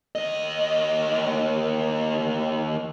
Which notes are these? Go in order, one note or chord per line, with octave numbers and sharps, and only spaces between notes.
D#2 D#5